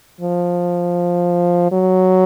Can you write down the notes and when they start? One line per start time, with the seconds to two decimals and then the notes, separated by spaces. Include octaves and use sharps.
0.21 F3
1.72 F#3